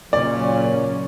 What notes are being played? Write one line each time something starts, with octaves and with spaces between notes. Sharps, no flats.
A#2 C#3 F#3 C#4 D5